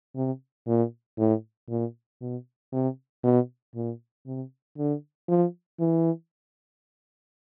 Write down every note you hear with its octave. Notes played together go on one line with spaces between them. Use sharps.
C3
A#2
A2
A#2
B2
C3
B2
A#2
C3
D3
F3
E3